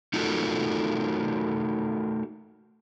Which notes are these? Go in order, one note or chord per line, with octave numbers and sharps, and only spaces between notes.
A3 D#4 F4 F#4 A4 A#4